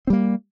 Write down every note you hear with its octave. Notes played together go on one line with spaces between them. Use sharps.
G3 A#3 C4